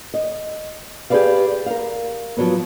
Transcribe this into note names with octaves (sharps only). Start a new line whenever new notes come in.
D#5
G4 G#4 A#4 B4 D5 F5
A#4 F5
F3 F#3 B3